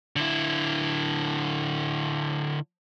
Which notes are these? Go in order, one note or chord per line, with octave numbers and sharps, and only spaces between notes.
D3 E4